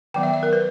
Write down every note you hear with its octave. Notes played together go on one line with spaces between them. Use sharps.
D#3 F#3 B3 G5
E5
E5
A#4
B4